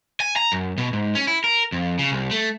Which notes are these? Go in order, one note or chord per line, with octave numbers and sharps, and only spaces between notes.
G#5
A#5
F#2
B2
G#2
C#4
E4
A#4
F2
C#3
C2
A3